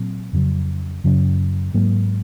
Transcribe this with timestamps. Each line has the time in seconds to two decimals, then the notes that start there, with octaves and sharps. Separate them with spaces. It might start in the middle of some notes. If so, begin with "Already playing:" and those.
Already playing: A#2 F#3 C4
0.33 F2 C#3 F#3 C#4
1.04 F#2 C#3 F#3 C#4
1.74 G#2 F#3 A#3